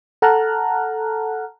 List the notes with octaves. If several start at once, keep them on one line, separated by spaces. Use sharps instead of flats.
A4 F#5 A5 A#5 F6 F#6